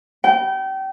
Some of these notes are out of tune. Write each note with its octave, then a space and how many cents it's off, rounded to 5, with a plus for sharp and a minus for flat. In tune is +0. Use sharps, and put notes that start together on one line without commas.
G5 -30